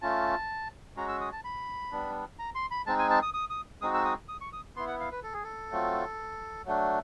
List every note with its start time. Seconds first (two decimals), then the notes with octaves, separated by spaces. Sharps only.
0.02 A3 C#4 F4 A5
0.97 G#3 C#4 F#4 A#5
1.08 E6
1.21 D#6
1.32 A5
1.44 B5
1.92 G3 B3 D4
2.39 A#5
2.55 C6
2.71 B5
2.86 G#3 C4 D#4 A5
2.99 G#5
3.10 A5
3.22 D#6
3.34 D#6
3.50 D#6
3.82 G#3 C4 D#4 F#4 D#6
3.94 E6
4.05 D#6
4.29 D#6
4.41 C#6
4.53 D#6
4.76 B3 E4 C6
4.87 F#5
5.00 F5
5.12 B4
5.23 A4
5.33 G#4
5.44 A4
5.71 F#3 A3 C4 F4
6.65 F#3 A3 D4